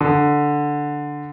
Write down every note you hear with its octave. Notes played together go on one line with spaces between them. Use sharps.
D3